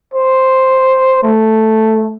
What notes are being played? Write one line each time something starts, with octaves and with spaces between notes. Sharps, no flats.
C5
A3